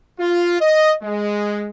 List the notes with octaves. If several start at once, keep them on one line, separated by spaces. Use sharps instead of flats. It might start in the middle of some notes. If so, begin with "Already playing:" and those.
F4
D#5
G#3